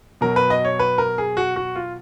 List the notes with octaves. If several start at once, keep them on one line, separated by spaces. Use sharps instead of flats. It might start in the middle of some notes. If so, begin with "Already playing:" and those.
B2 F#3 A#4
B4
D#5
C#5
B4
A#4
G#4
F#4
F#4
F4